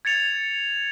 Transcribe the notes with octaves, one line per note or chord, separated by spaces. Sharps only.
G#6 A6 C#7 F7